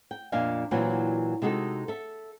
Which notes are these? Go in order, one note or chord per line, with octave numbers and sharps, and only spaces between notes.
G5
F2 A#2 D4 D#5 F5 G#5
A#2 E3 F#3 C4 F#5
C3 G#3 D#4 F#4 A4
A4 E5